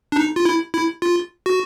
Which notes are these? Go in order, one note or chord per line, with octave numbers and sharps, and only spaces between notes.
D4
D#4
F4
E4
E4
F4
F#4